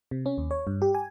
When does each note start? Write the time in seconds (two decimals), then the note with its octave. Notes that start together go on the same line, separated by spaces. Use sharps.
0.11 C3
0.26 C#4
0.38 D#2
0.51 C#5
0.67 G2
0.82 G4
0.95 G#5